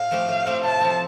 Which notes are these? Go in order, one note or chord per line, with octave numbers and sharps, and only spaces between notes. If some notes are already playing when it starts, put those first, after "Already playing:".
Already playing: A2 F5
F3 A3 C4 G4
A2
F3 A3 C4 G4
C3 A5
F3 C4